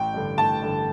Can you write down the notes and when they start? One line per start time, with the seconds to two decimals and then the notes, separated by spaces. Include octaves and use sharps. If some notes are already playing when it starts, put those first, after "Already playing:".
Already playing: A1 G5
0.14 G2 D3
0.37 A1 A5
0.62 G2 D3